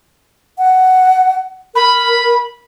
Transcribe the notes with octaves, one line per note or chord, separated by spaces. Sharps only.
F#5
A#4 B5